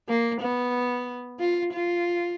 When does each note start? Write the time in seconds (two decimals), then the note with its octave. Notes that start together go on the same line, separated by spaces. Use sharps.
0.09 A#3
0.41 B3
1.40 F4
1.73 F4